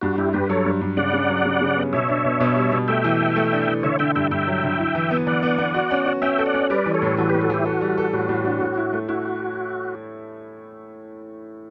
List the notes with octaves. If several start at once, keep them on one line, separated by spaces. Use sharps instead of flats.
G2 F#4
G2 E4 G4
G2 G4 B4
F#3 A4 C#5
G2
G2
C#3 D5 F#5
C#3
F#3
C#3
C#3
B3
B2 C#5 E5
D4
B2
B2
G3
B2
A3 E5 G5
E3
A4
A3
D4
E3
D3 C#5 E5
D3 E5 G5
G2 E5 G5
G2 E5 G5
F#3
D3
E4
E3
B3
E3 D5 F#5
B3
B3
F#4
C#4
F#4
C#4 E5 G5
A4
D5 F#5
C#4
G3 B4 D5
E3
A4 C#5
A2
E3 F#4 A4
A2 G4 B4
F#4 A4
E3 E4 G4
F#4 A4
G3
A4
A2 F#4
A2
D4
A2
E4
A3
E4 F#4